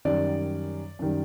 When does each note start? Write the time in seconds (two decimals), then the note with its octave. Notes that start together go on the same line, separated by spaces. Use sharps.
0.05 F#2 D#3 G3 D5
0.99 F#2 D#3 G3